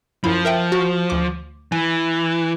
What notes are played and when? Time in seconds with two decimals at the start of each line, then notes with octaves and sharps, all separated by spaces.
0.24 F#2 F3 E4 B5
0.45 A#4 E5 G5
0.72 F#4
1.10 D2 D6
1.72 E3 G#5